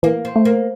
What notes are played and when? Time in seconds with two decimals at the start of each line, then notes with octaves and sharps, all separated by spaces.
0.03 E3 A#3
0.25 C4
0.36 A3
0.45 A#3